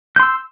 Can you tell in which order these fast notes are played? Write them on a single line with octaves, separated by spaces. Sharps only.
G6 C6 E6